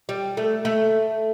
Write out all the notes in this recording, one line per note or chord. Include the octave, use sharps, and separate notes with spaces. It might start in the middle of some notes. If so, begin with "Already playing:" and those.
G3
A3
A3